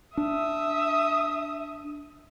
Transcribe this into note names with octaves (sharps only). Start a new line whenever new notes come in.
D4 E5 D#6